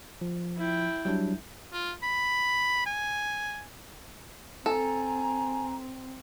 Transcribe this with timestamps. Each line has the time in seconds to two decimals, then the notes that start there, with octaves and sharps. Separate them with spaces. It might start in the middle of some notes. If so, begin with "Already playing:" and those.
0.21 F3
0.58 E4 G5
1.05 F#3 G3 D4
1.73 F4
2.03 B5
2.86 G#5
4.66 C4 A4 G#5 A#5